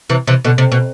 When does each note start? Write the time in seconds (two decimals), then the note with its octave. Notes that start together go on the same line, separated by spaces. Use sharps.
0.10 C3 E3
0.27 C3 E3
0.45 B2 D3
0.58 C3
0.72 B2